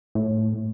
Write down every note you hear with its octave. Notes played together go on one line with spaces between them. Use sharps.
A2